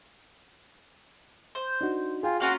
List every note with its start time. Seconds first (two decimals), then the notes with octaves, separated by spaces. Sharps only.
1.55 C5
1.81 D4 D#4 F#4
2.23 F4 G#4 G5 G#5
2.40 A#3 C#4 F4 F#4